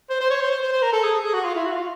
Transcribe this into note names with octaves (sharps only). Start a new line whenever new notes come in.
C5
C5
C#5
C5
C5
C5
C5
A#4
A4
G#4
A4
G#4
F#4
F4
E4
F#4
F4